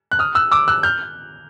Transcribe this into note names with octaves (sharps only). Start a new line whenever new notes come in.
F#6
D#6 F6
E6 F#6
D6 E6
E6 F#6
F6 G6